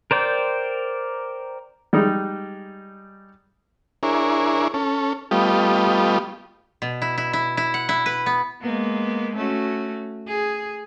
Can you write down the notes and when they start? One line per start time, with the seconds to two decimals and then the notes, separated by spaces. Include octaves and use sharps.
0.11 A#4 C5 D5 G5
1.93 G3 G#3 D#4
4.03 D4 E4 G#4 A#4 C#5
4.74 C#4 A4
5.31 G3 A3 B3 F4 G4 D#5
6.82 B2
7.02 E4
7.18 E4
7.33 E4
7.57 E4
7.74 F#5
7.89 E4
8.06 B4
8.26 B3
8.62 G#3 A#3 B3
9.36 A3 C#4 F#4
10.28 G#4